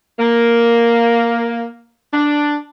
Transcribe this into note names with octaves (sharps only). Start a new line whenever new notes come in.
A#3
D4